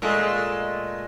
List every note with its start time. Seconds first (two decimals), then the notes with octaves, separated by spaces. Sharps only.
0.02 A#2 G#3 A3